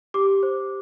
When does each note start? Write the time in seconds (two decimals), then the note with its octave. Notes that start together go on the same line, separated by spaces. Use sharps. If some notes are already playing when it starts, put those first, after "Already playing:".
0.14 G4 D6
0.43 C5